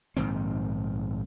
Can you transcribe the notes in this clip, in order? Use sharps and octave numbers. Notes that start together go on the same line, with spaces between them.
A#1 G#2 D#3 C4